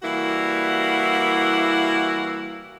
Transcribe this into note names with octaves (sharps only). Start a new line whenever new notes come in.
E3 G3 A#3 E4 F#4